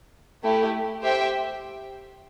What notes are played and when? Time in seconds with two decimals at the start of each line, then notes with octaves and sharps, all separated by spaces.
0.43 A3 E4 G4
1.02 G4 C5 E5 G5